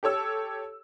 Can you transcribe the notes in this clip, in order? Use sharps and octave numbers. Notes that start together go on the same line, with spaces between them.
G4 A4 C#5 E6